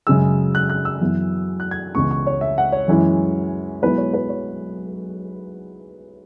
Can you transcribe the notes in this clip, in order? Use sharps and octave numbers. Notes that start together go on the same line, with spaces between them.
F#2 C#3 G#3 E6
F#6
F#6
E6
F#2 E3 B3
F#6
G#6
C#2 C#3 E3 B3 C#6
C#6
C#5
E5
F#5
C#5
F#2 E3 G#3 C#4 E4
B1 B2 G#3 B3 E4 B4
C#5
B4
C#5